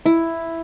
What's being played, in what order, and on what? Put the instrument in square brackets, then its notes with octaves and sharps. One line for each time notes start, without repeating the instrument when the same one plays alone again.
[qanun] E4